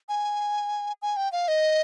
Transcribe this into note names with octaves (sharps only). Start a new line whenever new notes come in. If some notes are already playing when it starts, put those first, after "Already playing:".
G#5
G#5
G5
F5
D#5